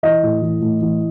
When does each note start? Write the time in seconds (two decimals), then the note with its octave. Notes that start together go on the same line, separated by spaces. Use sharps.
0.03 E3 D#5
0.23 A2
0.42 E3
0.61 A2
0.81 E3